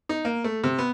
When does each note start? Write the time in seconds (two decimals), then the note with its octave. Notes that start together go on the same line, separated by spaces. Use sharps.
0.09 D#4
0.25 A#3
0.44 A3
0.64 C3
0.78 B3